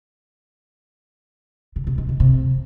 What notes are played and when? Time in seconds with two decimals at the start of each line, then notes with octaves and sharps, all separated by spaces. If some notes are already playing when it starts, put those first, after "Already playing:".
1.76 C#3
1.87 C3
1.98 D#3
2.09 C#3
2.20 C3